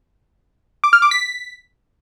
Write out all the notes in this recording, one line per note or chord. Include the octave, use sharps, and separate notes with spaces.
D6
F6
D6
B6